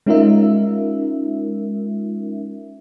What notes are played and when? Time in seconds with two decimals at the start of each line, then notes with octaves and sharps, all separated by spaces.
0.06 G#3 C#4 D#4 F4 A#4 E5